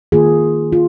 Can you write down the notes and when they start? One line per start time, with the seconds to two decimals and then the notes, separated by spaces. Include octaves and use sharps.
0.12 D#3 A#3 F4 G#4
0.73 F4